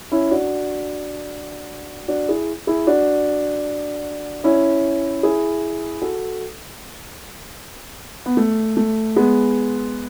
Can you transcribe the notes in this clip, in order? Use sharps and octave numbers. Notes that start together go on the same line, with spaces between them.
C#4 E4
D4 F#4
D4 F#4
E4 G#4
E4 G#4
D4 F#4
C#4 E4
E4 G#4
F#4 A4
B3
A3
A3
G#3 B3